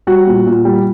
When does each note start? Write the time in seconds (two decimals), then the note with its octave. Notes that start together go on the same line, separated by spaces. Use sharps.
0.07 G3 F#4
0.27 A#2
0.46 A#2
0.65 G3